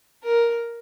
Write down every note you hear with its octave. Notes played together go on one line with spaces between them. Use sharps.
A#4